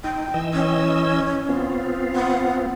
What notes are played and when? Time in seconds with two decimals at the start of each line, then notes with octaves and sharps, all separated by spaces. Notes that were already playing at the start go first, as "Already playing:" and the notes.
0.04 D#4 G5
0.34 E3 D#5 E6
0.53 C#4
1.49 B3 C4 F4
2.15 F#5